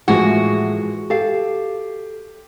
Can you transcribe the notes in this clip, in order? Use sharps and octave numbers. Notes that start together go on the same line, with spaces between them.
A2 E3 F3 G#3 A#3 F#4
G4 A4 F5